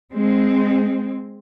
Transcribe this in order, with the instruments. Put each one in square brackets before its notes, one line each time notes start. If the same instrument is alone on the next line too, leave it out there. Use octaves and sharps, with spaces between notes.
[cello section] G#3 C4